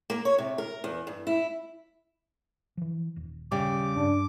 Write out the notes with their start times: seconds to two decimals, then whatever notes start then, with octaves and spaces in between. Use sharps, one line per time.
0.10 A#3
0.25 C#5
0.38 C3
0.58 A#4
0.84 E2
1.07 G2
1.27 E4
2.77 E3 F3
3.16 D#1
3.52 C#3 G3 D6
3.96 G2 D4